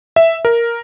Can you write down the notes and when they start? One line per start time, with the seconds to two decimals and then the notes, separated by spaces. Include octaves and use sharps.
0.16 E5
0.45 A#4